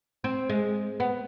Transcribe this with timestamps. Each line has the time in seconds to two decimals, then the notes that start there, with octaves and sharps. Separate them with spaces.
0.24 C4
0.49 G#3
1.00 B3